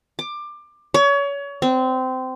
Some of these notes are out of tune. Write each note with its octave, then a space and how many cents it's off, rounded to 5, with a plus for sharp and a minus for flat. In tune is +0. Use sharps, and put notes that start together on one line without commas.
D6 +20
C#5 +30
C4 -20